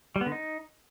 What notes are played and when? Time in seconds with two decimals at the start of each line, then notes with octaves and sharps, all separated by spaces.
0.16 G3
0.21 B3
0.26 D3
0.32 D#4